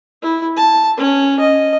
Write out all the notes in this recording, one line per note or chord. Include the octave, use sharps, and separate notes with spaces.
E4
A5
C#4
D#5